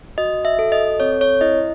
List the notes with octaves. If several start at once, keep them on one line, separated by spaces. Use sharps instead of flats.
F#4 D#5
E5
A4
D#5
C4 C#5
C#5
E4 D#5